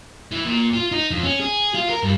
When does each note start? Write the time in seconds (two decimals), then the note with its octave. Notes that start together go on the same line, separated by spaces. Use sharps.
0.32 E3
0.45 A#2
0.74 F4
0.92 D#4
1.11 F2
1.24 C#4
1.40 G#4
1.75 F4
1.89 A#4
2.03 G2